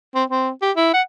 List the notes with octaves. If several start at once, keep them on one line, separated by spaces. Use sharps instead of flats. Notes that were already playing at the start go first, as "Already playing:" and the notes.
C4
C4
G4
E4
F#5